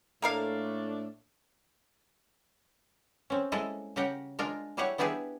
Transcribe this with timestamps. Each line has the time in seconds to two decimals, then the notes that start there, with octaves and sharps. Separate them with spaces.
0.22 A2 A3 A#3 D4 A#4 F5
3.30 C4 C#4
3.52 G#3 A#3 E4 A4 D#5
3.96 C#3 G4 A#4 F#5 G5
4.39 G#3 D4 F4 A#4
4.77 G3 E4 G4 G#4 C#5 F#5
4.98 B3 D4 E4 G4 G#4 B4